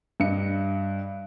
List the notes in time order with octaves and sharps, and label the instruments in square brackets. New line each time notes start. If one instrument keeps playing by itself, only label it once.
[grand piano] G2 D#5 C#7